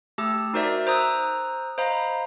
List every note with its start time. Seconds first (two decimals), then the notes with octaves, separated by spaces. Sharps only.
0.18 A3 G4 A5 E6
0.54 D#4 F#4 A#4 C5 D5 E5
0.87 C5 A#5 D#6 E6 F#6
1.78 C5 D#5 F5 A#5 B5